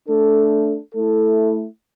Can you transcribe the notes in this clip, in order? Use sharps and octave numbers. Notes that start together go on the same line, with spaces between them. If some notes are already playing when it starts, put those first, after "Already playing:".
A3 D4 A4
A3 E4 A4